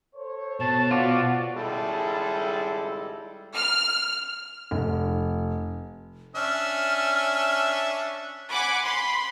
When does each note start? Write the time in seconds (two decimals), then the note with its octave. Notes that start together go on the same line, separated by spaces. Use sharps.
0.15 A4 C5 C#5
0.60 B2 A5
0.91 F4 F#4 D5
1.54 G#1 C#2 G3 G#3 E4 A4
3.56 F6
4.71 F1
6.36 C#4 D4 E5 F6
8.51 F#5 G#5 B5 D6
8.83 B5 C6